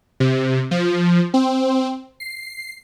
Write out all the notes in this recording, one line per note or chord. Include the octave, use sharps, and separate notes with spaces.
C3
F3
C4
C7